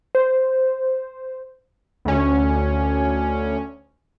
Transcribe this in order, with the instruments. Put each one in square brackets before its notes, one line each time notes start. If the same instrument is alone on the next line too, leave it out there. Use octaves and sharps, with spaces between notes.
[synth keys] C5
[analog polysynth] D2 C#4